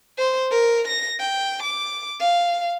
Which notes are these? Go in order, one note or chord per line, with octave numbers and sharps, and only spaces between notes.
C5
A#4
A#6
G5
D6
F5